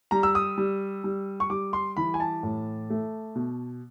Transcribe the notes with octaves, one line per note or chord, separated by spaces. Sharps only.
G3 A#5
E6
D#6
G3
G3
C#6
G3 D6
C6
E3 B5
G#5
A5
A2
A3
B2